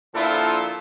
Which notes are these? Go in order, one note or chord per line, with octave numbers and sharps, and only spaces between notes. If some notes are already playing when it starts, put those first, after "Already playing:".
A#2 D3 F3 E4 F4 A4